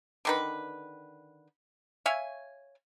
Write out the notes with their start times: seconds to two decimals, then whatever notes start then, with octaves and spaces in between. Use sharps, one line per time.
0.25 D3 D#3 B4
2.06 C#5 E5 F5 G#5